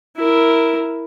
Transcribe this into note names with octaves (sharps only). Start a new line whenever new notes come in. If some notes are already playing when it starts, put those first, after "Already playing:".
E4 A#4